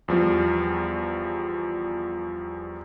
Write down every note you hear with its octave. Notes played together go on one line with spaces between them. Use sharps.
E2 F3 G3